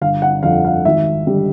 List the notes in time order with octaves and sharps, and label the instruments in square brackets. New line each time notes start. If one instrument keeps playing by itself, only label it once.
[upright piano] G1 F5
F#5
F2 D3 F5
F5
G#1 E5
D3 G3